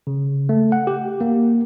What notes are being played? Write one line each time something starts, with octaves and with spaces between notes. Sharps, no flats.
C#3
A3
F#5
G4
A#3